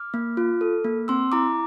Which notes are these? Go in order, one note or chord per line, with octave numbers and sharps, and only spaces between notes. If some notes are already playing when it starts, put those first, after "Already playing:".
Already playing: D6 F6
A#3
F4
A4
A#3
C4 C6 E6
E4 A#5 D6